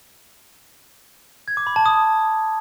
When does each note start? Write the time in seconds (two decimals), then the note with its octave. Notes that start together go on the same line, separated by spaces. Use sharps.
1.48 G#6
1.57 D6
1.67 B5
1.76 A5
1.86 D#6